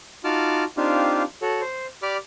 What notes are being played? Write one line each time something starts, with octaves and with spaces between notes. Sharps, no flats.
D#4 F4 F#4 A5 D6 F6
C4 D4 D#4 F4 G4 F5
F#4 A4 C#5
C5
G4 D5 B5 D6 F6